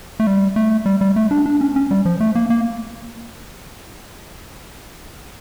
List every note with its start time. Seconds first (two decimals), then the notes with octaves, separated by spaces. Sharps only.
0.20 A3
0.27 G3
0.56 A3
0.86 G3
1.01 G3
1.16 A3
1.31 D4
1.46 D4
1.61 C#4
1.76 C#4
1.91 G3
2.05 F3
2.20 A3
2.35 A#3
2.50 A#3